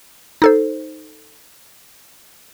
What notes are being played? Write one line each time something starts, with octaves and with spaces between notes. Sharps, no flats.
D#4 A4 C5